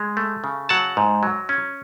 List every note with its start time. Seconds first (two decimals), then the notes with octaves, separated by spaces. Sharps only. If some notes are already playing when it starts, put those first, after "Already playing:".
Already playing: G#3
0.17 A3
0.44 C#3
0.69 F#3 F#5 A5
0.97 G#2
1.23 F#3
1.49 C#4